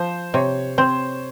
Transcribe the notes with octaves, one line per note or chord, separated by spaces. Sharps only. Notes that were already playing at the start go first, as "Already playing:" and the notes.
Already playing: F3 C5
C3 C#5
C4 C5